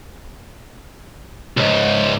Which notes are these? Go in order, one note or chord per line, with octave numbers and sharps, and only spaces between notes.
C#2 G#2